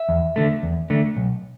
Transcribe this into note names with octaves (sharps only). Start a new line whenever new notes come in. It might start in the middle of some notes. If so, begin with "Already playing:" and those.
Already playing: E5
E2
D3 A3
E2
D3 A3
B1